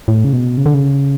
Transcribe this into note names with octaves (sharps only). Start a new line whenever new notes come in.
A2
C#3
B2
C#3
D3
C#3